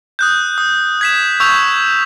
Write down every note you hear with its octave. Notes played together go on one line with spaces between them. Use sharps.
D#6 F#6 G6
D#6
G#6 B6 E7
C#6 E6 G6 F7